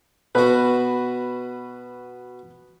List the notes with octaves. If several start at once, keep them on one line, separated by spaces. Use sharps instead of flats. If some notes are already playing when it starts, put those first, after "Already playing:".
B2 F#4 B4